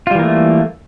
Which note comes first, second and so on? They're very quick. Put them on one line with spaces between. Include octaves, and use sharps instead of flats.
F4 G3 E3 A#3 A3